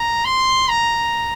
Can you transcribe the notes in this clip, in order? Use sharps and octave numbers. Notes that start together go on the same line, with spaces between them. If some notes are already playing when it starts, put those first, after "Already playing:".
Already playing: A#5
C6
A#5